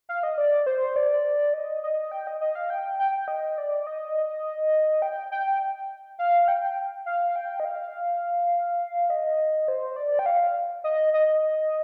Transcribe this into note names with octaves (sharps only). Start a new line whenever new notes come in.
F5
D#5
D5
C5
D5
D#5
D#5
G5
D#5
D#5
F5
G5
G5
D#5
D5
D#5
G5
G5
F5
G5
F5
G5
D#5
F5
D#5
C5
D5
G5
F5
D#5
D#5